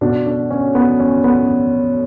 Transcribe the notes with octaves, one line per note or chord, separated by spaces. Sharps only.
B2 D4
D4
C#4
B3
C#4
B3